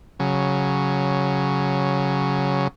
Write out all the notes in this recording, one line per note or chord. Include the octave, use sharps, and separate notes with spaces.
C#3 F#3